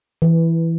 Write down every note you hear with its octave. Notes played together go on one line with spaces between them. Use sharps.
E3